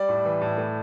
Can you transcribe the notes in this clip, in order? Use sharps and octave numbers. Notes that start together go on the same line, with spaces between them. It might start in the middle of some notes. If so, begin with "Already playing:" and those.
Already playing: G3 D5
A2
E3
A2
A3